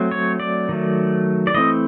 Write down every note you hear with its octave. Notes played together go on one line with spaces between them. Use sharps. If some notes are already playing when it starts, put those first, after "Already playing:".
Already playing: F#3 A3 C4
C#5
D5
D#3 F#3 A3
D5
E3 A3 C4 D#5